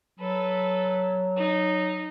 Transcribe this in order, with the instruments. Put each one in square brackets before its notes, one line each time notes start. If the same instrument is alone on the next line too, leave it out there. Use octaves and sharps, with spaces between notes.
[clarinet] F#3 [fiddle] A4 B4
[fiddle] D#4